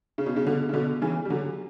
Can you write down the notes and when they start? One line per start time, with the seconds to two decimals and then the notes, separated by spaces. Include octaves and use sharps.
0.18 C#3
0.26 B2
0.36 C#3
0.45 B2 D3
0.69 C#3
0.73 B2 D3
1.02 C#3 E3
1.25 G3
1.30 D3 F#3